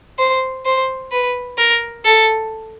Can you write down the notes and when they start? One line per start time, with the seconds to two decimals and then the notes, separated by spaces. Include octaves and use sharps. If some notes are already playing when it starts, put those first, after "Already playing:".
0.19 C5
0.66 C5
1.12 B4
1.58 A#4
2.05 A4